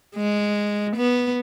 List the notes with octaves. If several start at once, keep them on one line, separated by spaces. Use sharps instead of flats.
G#3
B3